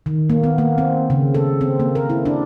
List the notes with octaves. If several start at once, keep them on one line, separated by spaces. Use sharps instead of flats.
D#3
A#3
B3
A#3
C4
C#3
A4
C4
A#3
A#4
E4
D4